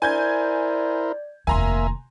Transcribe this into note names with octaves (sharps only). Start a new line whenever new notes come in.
E4 A#4 C5 D5 G#5 G6 G#6
F1 D#2 A#3 E5 G#5 A#5 C6